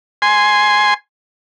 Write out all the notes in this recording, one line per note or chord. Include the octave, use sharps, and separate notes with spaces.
G#5 C6